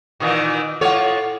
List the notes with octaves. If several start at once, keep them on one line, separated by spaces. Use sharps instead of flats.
A#2 D#3 E3
A2 F4 A4 C#5 F#5